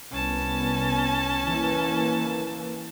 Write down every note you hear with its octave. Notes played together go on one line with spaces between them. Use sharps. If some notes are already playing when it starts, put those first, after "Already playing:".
C2 B3 C#4 A5
E3 A#3